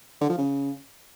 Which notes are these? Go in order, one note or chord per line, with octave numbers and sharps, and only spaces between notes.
D3
F3
C#3